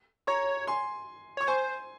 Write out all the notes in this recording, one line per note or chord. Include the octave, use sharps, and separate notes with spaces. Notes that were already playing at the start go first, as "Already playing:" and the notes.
C#5 A#5 C#6
G#5 C6
C#5 C#6
C5 G#5 C6